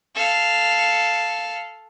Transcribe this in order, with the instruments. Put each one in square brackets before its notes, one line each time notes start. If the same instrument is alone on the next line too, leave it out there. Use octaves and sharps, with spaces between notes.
[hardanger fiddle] A4 F5